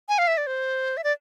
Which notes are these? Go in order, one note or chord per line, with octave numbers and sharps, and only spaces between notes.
G#5
F5
E5
D5
C5
E5
D5